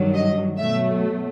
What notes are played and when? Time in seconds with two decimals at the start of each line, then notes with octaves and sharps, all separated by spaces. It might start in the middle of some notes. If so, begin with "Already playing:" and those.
Already playing: G2 D#3 F#3
0.14 D#5
0.58 B2 F#3 A3 E5